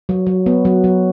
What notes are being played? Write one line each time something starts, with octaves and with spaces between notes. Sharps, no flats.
F#3
F#3
B3
F#3
F#3